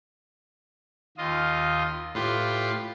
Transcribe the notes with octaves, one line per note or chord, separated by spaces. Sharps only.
D#2 F4 D#5
A2 F4 G4 B4 C6